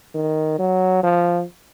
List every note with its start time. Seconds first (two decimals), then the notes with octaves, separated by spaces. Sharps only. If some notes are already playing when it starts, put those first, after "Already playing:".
0.15 D#3
0.59 F#3
1.03 F3